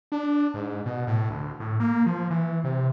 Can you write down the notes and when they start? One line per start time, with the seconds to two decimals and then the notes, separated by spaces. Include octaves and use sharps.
0.12 D4
0.54 G#2
0.86 B2
1.07 A2
1.30 D2
1.60 A2
1.80 A#3
2.06 F3
2.30 E3
2.64 C3